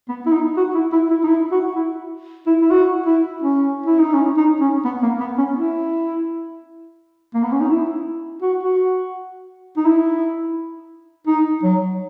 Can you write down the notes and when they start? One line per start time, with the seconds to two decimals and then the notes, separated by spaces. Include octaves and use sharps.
0.09 B3
0.26 E4
0.33 D#4
0.57 F#4
0.75 E4
0.92 E4
1.10 E4
1.24 D#4
1.28 E4
1.52 F#4
1.75 E4
2.47 E4
2.61 E4
2.71 F#4
3.06 E4
3.42 C#4
3.86 E4
3.99 D#4
4.13 C#4
4.37 D#4
4.61 C#4
4.85 B3
5.03 A#3
5.20 B3
5.38 C#4
5.56 E4
7.34 A#3
7.43 B3
7.52 C#4
7.61 D#4
7.70 E4
8.42 F#4
8.63 F#4
9.77 D#4
9.85 E4
11.27 D#4
11.63 F#3